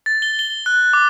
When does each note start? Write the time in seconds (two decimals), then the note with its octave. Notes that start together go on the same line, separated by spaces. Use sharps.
0.06 A6
0.22 G7
0.39 G7
0.66 F#6
0.93 D6